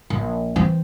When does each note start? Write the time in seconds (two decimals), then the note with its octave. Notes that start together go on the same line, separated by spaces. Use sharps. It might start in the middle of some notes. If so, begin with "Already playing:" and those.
0.10 A#1
0.56 E3 C4